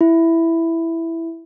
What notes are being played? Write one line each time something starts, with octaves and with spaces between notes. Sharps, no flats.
E4